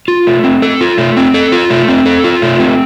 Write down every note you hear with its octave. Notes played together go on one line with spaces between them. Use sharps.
F4
A3
C4
A4
F4
A3
C4
A4
F4
A3
C4
A4
F4
A3
C4